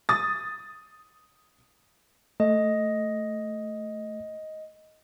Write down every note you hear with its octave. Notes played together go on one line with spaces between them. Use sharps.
D#6 A6
A3 D#5